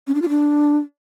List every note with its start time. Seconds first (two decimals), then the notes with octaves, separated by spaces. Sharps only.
0.07 C#4
0.15 D4
0.22 F4
0.29 D4